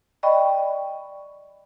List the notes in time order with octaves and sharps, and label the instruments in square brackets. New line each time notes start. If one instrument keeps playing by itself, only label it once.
[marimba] D5 D#5 G5 B5 C#6